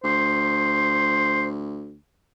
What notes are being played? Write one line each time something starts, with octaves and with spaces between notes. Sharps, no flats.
D2 C5